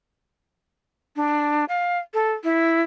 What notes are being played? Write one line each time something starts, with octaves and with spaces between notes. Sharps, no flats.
D4
F5
A4
E4